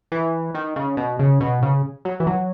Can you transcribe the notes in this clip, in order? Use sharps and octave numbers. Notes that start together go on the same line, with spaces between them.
E3
D#3
C#3
B2
C#3
B2
C#3
F#3
E3
F#3